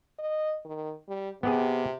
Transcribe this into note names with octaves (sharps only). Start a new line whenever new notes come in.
D#5
D#3
G3
C3 B3 G4 G#4